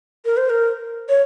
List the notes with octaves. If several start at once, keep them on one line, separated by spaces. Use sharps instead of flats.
A#4
C5
A#4
C#5